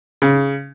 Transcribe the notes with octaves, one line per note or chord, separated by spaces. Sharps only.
C#3